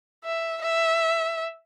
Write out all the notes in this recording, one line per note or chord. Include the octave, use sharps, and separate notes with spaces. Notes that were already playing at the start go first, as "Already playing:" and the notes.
E5
E5